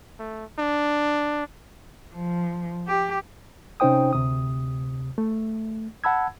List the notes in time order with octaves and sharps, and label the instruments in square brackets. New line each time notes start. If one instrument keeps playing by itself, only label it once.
[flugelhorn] A3
D4
[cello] F3
G4
[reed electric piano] C3 C#4 D#4 C5 G5 D#6
D2 C3 D#6
A3
F#5 A5 B5 E6 G#6